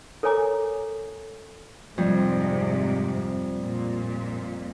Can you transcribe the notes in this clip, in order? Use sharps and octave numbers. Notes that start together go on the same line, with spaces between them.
A4 A#4 C#5 G#5 A#5 D6
F2 G#2 C3 G3
A#2